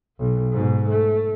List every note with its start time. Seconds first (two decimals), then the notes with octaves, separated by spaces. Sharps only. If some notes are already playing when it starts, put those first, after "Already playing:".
0.18 B1
0.52 G#2 B2
0.89 A3